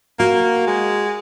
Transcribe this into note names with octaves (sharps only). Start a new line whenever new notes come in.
A#3 F#4
G#3